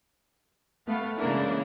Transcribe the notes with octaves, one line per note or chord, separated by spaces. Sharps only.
A3 B3 F5
C#3 E3 G#3 A#3 D4 E4